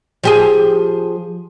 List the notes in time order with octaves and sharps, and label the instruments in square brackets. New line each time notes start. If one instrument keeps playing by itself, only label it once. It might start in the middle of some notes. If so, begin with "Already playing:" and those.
[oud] F3 G4 G#4